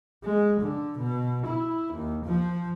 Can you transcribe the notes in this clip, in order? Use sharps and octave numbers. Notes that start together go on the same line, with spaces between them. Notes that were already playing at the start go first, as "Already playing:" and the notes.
G#3
D3
B2
E4
D#2
F3